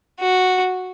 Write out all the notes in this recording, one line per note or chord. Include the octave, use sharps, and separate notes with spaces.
F#4